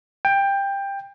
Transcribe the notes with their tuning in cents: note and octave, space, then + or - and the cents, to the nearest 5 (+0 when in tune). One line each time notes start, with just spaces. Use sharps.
G5 +15